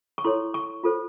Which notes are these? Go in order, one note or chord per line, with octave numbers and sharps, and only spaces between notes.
C#6
E4 A4 C#5 C6
C#6
F4 A4 C5